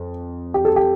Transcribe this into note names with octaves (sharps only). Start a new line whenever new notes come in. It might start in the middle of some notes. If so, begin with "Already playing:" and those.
Already playing: F2
G4
A4
G4